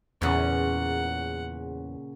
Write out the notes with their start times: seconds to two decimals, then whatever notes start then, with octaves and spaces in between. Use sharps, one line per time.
0.22 E2 A#2 C#3 F#5